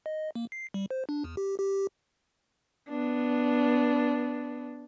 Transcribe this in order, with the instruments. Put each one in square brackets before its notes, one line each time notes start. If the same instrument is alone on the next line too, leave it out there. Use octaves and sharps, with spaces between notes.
[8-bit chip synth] D#5
A#3
C7
G3
C5
D4
E2
G4
G4
[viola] B3 D4